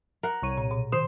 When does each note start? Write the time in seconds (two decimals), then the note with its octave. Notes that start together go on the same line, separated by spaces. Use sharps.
0.23 A#4 F#5
0.42 C2 C#5 D#7
0.58 A#2
0.71 B2
0.92 D#3 C5 E7